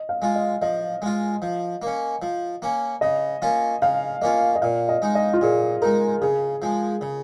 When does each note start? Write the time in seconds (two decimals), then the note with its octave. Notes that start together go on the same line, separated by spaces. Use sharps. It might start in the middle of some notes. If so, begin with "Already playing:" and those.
Already playing: D#5
0.09 F5
0.22 G#3 F4
0.36 D#5
0.62 F3 D#5
1.02 G#3 F4
1.42 F3
1.82 A#3
1.87 C#4
2.22 F3
2.62 A#3 C#4
3.01 C#3 D#5
3.42 A#3 C#4 F4
3.82 C#3 F5
4.22 A#3 C#4 F4 D#5
4.55 D#5
4.62 A#2 F5
4.89 D#5
5.02 G#3 D#4
5.15 D#5
5.34 F4
5.41 A#2 G#4
5.82 G#3 D#4 A#4
6.22 C#3 G#4
6.62 F3 G#3
7.01 C#3